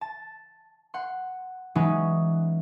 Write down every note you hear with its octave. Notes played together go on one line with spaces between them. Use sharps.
A5
F#5 C6
E3 F#3 G#3 B3 C#4 D#4